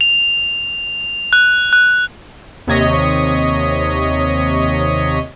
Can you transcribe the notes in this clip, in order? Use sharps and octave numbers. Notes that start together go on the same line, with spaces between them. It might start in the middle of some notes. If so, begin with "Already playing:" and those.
F7
F#6
F#6
D#2 C3 C#5 D#5 B6